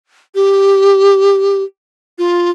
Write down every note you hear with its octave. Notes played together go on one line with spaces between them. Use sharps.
G4
F4